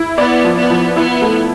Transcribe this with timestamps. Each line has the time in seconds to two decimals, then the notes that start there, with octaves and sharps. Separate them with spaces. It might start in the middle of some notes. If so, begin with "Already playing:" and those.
Already playing: E4
0.18 B3 D5
0.44 F3
0.57 B3
0.70 F3
0.96 B3 E4
1.22 A3